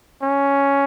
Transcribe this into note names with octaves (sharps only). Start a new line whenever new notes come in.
C#4